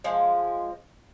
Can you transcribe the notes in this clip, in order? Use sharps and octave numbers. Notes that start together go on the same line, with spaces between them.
F3 G#3